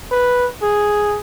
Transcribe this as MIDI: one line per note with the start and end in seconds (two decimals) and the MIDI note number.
0.12 0.47 71
0.62 1.19 68